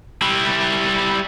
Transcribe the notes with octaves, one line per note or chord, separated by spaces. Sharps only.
G3 E4